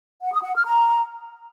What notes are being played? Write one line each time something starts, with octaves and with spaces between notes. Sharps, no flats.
F#5
D#6
F#5
F6
A#5